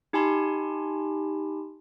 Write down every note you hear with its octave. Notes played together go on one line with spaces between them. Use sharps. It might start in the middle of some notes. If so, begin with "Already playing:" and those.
D#4 G4 G#5 A5 B5 C6